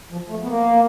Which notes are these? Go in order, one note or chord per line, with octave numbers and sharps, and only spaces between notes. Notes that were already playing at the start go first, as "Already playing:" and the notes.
F3
A3
B3
A#3